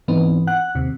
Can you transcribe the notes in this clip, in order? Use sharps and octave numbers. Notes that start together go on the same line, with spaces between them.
G#2 E3 B3 C4 D#4
F#5 F#6
D#2 C3